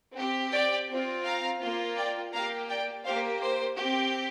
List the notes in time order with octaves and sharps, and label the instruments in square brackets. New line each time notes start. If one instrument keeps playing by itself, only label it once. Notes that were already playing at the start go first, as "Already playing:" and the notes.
[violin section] C4 G4
D5 G5
C4 F4
F5 A#5
A#3 F4
D5 G5
A#3 G4 F5 A#5
D5 G5
A#3 G4 C5 F5
C5
C4 G4